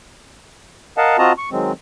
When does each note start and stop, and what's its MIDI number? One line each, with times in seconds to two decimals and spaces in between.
0.98 1.17 70
0.98 1.17 75
0.98 1.17 77
0.98 1.17 78
0.98 1.17 81
1.18 1.32 60
1.18 1.32 65
1.18 1.32 66
1.18 1.32 75
1.18 1.32 81
1.18 1.32 82
1.38 1.49 85
1.51 1.72 51
1.51 1.72 54
1.51 1.72 56
1.51 1.72 60